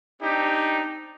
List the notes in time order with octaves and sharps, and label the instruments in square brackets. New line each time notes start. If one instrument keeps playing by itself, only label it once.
[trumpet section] C4 D4 D#4 G4